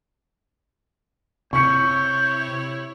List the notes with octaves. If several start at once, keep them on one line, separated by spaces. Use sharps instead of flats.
C3 E4 C#5 C#6 G6 C#7